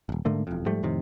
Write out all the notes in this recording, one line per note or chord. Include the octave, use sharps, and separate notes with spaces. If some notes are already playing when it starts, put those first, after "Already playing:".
D#1 G#1
G#2 D3 A3 A#3
E1 F2
G#2 F3 G3 A3
F2 A2 C3 D#3